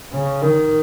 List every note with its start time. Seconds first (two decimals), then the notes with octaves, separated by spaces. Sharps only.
0.13 C#3
0.42 D#3